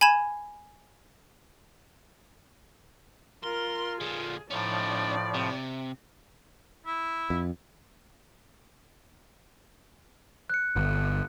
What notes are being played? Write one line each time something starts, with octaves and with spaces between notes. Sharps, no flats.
G#5 B5 G#6 E7
F4 A#4 C6
A#2 D3 G#4
A2 F3 C#4 D#4 D5
C3
E4
F2
F#6 C#7
G1